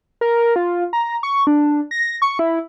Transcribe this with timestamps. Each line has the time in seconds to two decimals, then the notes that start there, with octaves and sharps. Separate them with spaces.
0.21 A#4
0.56 F4
0.93 A#5
1.23 C#6
1.47 D4
1.91 A#6
2.22 C#6
2.39 E4